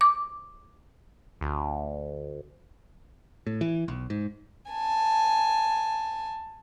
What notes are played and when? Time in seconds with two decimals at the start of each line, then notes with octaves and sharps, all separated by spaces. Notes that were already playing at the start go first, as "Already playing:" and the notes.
0.01 D6
1.41 D2
3.47 A2
3.61 E3
3.88 B1
4.10 G#2
4.71 G#5 A5